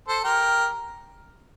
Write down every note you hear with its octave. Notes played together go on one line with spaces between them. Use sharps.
A4 C5
G4 A#4